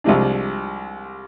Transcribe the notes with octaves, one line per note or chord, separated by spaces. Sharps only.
C2 C3 F3 G#3 D4